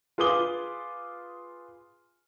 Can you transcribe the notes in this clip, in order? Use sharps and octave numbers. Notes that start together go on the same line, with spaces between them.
F4 G#4 B4 D6 D#6 G7